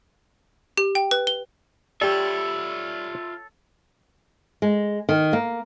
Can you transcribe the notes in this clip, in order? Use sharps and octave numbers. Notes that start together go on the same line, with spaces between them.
G4
G5
B4
G7
G3 F4 G4 A4 C#5 D5 E5
G#3
D#3
A#3